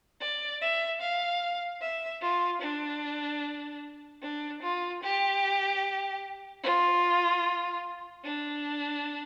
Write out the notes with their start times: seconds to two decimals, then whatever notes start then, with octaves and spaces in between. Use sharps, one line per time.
0.21 D5
0.61 E5
1.01 F5
1.81 E5
2.22 F4
2.62 D4
4.22 D4
4.62 F4
5.03 G4
6.63 F4
8.24 D4